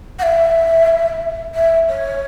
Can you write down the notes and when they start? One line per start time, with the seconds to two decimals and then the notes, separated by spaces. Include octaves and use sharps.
0.19 F#5
0.23 E5
1.55 E5
1.89 C#5